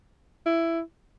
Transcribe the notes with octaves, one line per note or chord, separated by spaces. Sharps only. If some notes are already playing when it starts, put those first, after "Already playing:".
E4